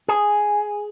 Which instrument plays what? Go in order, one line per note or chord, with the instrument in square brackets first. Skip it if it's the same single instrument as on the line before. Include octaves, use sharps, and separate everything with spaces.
[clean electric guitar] G#4